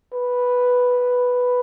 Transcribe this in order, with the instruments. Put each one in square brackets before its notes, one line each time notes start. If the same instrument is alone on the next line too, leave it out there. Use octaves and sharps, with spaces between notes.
[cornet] B4